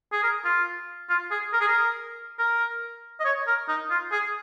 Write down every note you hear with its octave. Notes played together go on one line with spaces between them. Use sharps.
G#4
A#4
F4
F4
G#4
A#4
G#4
A#4
A#4
D#5
C#5
A#4
D#4
F4
G#4